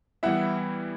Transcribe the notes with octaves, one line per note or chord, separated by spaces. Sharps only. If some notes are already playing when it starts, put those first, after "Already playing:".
E3 G3 B3 E4 E5 F#5